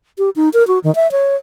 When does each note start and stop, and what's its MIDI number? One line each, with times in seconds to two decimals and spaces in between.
0.18 0.30 67
0.36 0.49 63
0.54 0.66 70
0.67 0.79 66
0.84 0.94 51
0.95 1.10 76
1.12 1.36 73